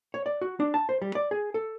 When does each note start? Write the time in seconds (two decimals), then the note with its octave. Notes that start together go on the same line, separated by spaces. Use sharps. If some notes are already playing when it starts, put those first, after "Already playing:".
0.14 C#5
0.26 D5
0.41 F#4
0.60 D4
0.74 A5
0.89 C5
1.02 G3
1.15 D5
1.31 G#4
1.54 A4